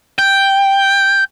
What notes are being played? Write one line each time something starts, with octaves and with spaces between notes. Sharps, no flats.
G5